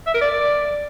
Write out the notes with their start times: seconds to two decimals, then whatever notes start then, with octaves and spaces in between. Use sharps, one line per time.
0.07 E5
0.14 A#4
0.21 D5